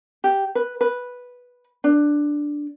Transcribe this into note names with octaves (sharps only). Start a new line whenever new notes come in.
G4
B4
B4
D4